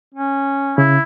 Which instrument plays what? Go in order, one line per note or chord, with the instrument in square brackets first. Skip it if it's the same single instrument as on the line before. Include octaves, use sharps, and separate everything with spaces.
[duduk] C#4
[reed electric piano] C#3 [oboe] E4